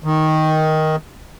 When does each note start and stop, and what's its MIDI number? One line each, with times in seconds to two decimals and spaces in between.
0.04 0.96 51